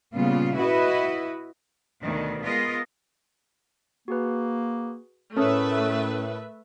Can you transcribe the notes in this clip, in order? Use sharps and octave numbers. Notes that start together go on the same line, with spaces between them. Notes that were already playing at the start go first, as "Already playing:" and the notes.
A#2 C#3 G3 B3 F4
E4 F#4 B4 D#5
D2 B2 D#3
G#3 B3 F4 A#4 D#5
A#3 F#4 G#4 B4
A2 A3 C#4 A#4 B4 E5 A5 D#6